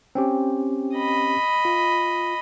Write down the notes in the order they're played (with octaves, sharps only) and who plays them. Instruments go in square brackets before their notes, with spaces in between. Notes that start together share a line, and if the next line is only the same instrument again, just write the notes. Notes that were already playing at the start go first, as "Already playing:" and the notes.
[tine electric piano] C4 C#4 G4
[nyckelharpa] D#5 B5
[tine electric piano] F4